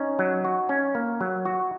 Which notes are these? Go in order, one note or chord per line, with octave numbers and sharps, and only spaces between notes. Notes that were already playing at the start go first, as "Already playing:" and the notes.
Already playing: C#4 D#4
F#3
F#4
C#4
A#3
F#3
F#4